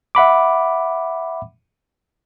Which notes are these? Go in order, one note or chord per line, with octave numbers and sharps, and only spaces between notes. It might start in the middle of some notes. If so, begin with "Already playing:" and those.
E5 F#5 B5 D6